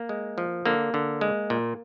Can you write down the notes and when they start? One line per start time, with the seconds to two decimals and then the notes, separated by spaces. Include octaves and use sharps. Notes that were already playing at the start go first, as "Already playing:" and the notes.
Already playing: A#3
0.09 G#3
0.38 F3
0.66 D3 A#3
0.94 D3
1.21 G#3
1.50 A#2